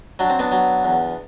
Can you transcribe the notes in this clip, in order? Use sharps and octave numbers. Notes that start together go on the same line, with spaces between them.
F#3 D4
C4
B3 D4
F#3
E2